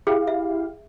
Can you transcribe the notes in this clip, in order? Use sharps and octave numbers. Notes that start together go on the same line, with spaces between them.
E4 G4 G#4 F5
E5